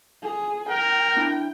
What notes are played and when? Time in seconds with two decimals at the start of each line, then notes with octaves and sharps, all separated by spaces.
0.22 G#4
0.69 A#4 G5
1.16 D4 E4